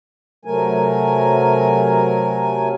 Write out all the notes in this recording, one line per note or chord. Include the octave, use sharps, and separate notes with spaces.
C3 F#3 A3 A#4 G#5